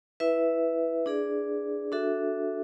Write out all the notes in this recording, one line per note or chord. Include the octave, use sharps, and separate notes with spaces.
E4 B4 E5
D4 G#4 D5
D4 F#4 A4 E5